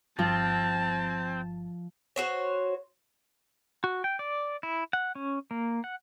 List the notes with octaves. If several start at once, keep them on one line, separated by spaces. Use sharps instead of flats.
G1 G2 F3 C4 A5
F#4 C5 C#5
F#4
G5
D5
E4
F#5
C#4
A#3
F#5